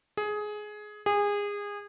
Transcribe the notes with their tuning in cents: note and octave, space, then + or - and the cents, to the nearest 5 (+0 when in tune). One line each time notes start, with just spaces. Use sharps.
G#4 +15
G#4 -25